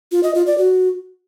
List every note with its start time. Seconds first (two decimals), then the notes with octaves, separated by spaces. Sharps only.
0.12 F4
0.23 D#5
0.35 F4
0.46 D5
0.58 F#4